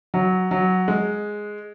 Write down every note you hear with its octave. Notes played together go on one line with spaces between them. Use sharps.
F#3
F#3
G#3